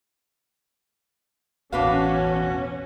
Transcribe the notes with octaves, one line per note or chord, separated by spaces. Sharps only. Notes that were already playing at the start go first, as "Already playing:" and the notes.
A1 E2 B2 C#4 D4 F#4 B4 F5